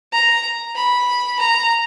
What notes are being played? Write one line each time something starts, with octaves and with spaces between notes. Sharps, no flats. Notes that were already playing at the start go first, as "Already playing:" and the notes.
A#5
B5
A#5